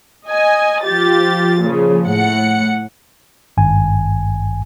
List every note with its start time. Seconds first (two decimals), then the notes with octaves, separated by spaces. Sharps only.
0.26 D#5 G#5
0.83 F3 F4 G4 A6
1.61 A#2 C#3 F3
2.05 A2 F#5 C#7
3.57 G#1 G2 G#5